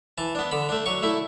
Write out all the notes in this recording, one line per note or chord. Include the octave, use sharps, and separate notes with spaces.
E3 A5
B3 D4
D3 B5
A3 D4
F#3 C#6
A3 E4